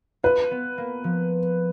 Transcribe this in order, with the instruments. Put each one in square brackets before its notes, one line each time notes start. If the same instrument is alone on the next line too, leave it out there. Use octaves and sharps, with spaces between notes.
[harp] F4 [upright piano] B4
[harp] B3
A#3
F3